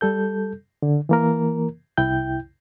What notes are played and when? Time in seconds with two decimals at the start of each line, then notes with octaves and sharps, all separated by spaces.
0.01 G3 A4 G6
0.82 D3
1.09 E3 A#3 A#4
1.97 C2 E4 G5 G6